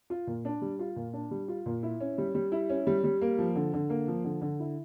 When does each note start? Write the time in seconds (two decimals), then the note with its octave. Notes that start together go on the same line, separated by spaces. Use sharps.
0.10 F4
0.27 A#2
0.45 D4
0.62 G3
0.79 F4
0.96 A#2
1.13 D4
1.31 G3
1.48 F4
1.66 A#2
1.83 E4
2.00 C#4
2.18 G3
2.35 G3
2.52 E4
2.69 C#4
2.87 G3
3.04 G3
3.22 A#3
3.39 F3
3.56 D3
3.74 D3
3.90 A#3
4.08 F3
4.24 D3
4.41 D3
4.60 E4